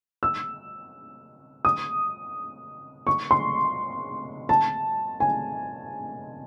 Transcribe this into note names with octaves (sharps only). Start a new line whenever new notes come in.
E6
D#6
C#6
C6
A5
G#5